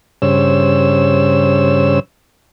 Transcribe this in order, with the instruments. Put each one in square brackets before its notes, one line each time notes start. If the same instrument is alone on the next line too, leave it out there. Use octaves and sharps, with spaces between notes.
[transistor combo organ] G2 C#3 C5 C#5 E6